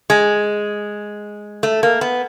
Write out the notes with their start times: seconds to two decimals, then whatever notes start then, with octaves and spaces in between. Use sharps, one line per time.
0.10 G#3
1.63 A3
1.83 A#3
2.01 B3